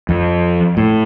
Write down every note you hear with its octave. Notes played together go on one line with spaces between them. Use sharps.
F2
A2